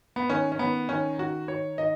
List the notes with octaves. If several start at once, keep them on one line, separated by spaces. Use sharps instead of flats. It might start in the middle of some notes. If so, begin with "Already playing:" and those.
B3
D#3 C#4
C#4
D#3 B3
D#3 C#4
D#3 F#4
D#3 C#5
D#3 D#5